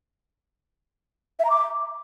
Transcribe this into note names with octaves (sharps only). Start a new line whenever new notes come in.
E5
A#5
D6